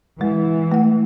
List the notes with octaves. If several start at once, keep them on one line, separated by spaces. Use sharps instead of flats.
E3 G#3
A3 F#5